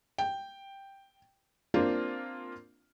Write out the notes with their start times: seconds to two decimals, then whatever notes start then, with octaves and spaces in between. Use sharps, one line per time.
0.18 G5
1.74 A#3 C4 D4 F4